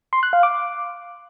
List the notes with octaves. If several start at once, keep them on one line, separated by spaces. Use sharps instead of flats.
C6
F#6
F5
D6